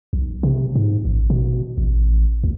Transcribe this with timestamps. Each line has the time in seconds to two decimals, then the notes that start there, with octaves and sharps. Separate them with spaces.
0.13 B1
0.43 C3
0.75 G#2
1.05 A1
1.30 B2
1.78 A1
2.44 D2